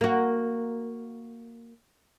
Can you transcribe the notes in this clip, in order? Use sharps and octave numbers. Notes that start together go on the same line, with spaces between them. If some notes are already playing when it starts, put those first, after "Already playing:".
A#3 F#4